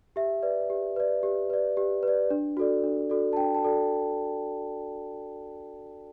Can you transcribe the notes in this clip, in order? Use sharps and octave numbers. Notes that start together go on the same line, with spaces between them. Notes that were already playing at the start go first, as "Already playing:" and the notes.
G4 E5
B4 D5
G4
B4 D5
G4
B4 D5
G4
B4 D5
D4
F#4 A4 D5
D4
F#4 A4 D5
A5
D4 G5
A5
F#4 A4 D5